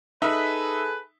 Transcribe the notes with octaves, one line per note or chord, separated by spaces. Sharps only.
D#4 G#4 A4 B4 E5